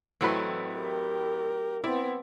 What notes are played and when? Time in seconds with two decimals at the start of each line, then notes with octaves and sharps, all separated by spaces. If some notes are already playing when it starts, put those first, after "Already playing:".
0.21 A1 F#3 A3 C4 E4 B4
0.75 G4 A#4
1.84 B3 C4 E4 D5